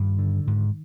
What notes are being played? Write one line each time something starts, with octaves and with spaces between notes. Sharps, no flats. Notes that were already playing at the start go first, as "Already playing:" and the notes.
Already playing: G2 D#3
D3
G#2